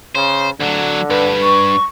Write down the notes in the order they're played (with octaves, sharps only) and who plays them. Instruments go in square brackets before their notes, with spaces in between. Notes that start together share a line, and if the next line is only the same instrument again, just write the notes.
[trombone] C#3 [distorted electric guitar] C5
[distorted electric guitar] D2 F#3 [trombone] D3
[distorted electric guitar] G2 [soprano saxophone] B4
[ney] C#6